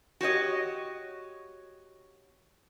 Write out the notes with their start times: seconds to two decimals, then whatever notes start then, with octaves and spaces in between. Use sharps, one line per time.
0.21 F#4 G4 C#5 D#5